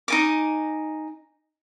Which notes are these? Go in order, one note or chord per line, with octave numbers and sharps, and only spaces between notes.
D#4 G#5 D6